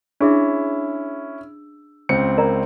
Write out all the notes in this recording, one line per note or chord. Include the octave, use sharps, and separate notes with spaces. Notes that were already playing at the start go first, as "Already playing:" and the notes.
C#4 D4 E4 G#4 E5
C#2 C4 C#7
A#4 D5 A#5